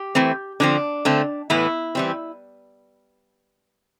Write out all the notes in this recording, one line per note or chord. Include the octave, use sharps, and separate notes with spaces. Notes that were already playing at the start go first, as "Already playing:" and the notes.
Already playing: G4
E3 A3 C4
D3 F3 C4 D4
D3 A3 C4
A2 E3 B3 E4
E3 G3 C4